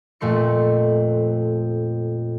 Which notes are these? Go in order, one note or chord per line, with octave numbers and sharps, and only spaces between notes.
F2 A#2 A3 C6 C#7